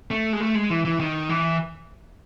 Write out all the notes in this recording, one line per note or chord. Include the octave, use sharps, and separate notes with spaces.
A3
G#3
A3
G#3
E3
E3
D#3
E3